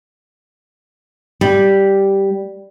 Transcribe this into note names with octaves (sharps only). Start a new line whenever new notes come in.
G3